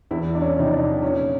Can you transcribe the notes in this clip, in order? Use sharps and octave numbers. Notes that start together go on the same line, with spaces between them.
E2 E4
D4
C#4
C3 F3 D#4
D4
A#2 C#4